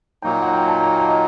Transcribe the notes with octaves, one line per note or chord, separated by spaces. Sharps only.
A#2 F#3 A#3 D#4 G5
F#5
G5
A5
A#5
F5
D#5